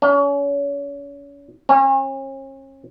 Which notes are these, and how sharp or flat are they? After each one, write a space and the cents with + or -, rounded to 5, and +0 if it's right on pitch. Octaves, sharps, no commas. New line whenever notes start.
C#4 +35
C#4 -40